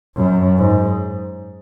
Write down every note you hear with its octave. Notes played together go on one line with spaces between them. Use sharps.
F#2
G#2